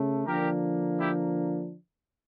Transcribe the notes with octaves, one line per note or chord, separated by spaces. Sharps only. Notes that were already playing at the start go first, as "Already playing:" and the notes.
Already playing: C#3 A3
D3 F3 A#3 D4 G4 A#4
E4 G4